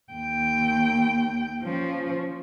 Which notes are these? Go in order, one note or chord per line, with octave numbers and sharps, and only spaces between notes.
D#2 G5
F3 C#4